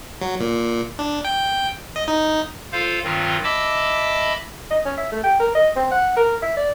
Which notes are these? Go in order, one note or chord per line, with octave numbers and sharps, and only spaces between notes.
F#3
A#2
D4
G5
D#5
D#4
F4 A4 C5 F5
G2 D#3 F#3 C4 F4
D#5 E5 A5 B5 D6 E6
D#5
C#4
E5
A3
G5
A#4
D#5
C4
F#5
A#4
E5
D5